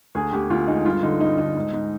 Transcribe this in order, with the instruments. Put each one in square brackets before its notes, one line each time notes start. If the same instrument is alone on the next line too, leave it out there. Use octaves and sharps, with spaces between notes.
[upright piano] D2 G#4
D2 G4
D2 F4
G#3 D#4
G2 F4
D3 D#4
G2 D#4
D3 D#4
G#2
G#2